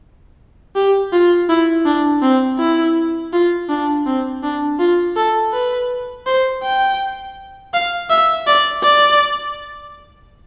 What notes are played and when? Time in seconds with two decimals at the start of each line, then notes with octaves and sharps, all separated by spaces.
0.76 G4
1.13 F4
1.49 E4
1.86 D4
2.22 C4
2.59 E4
3.33 F4
3.69 D4
4.06 C4
4.43 D4
4.79 F4
5.16 A4
5.53 B4
6.26 C5
6.63 G5
7.74 F5
8.10 E5
8.47 D5
8.83 D5